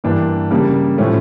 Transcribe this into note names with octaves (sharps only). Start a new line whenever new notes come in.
G2 E3 A#3 D4
C#3 G3 A#3
A2 F3 A3 C#4